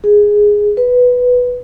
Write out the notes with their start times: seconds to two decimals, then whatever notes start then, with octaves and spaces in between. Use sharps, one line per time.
0.04 G#4
0.77 B4